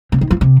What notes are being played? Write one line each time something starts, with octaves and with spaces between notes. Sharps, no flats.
C#3
D#3
F3
C3